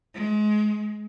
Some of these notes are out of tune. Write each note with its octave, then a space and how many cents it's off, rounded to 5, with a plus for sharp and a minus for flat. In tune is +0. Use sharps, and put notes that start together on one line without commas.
G#3 +30